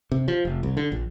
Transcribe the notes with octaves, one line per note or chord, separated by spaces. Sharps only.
C3
F3
F1
C2
D3
A#1